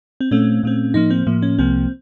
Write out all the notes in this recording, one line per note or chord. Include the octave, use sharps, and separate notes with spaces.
C4
A#2 A3 C4 C#4
A#2 A3 C4
A2 F3 A#3 D#4
C4
A2 F3 A#3
C#4
C2 C3 F3 A#3 C4